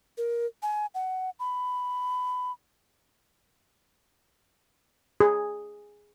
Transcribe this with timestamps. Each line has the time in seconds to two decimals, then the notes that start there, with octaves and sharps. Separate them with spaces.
0.18 A#4
0.63 G#5
0.95 F#5
1.40 B5
5.20 G#4